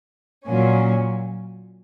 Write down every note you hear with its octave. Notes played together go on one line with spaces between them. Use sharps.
A#2 F#3 C#4